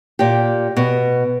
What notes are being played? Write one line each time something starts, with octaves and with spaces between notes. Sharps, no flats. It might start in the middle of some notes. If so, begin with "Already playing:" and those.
A#2 G4
B2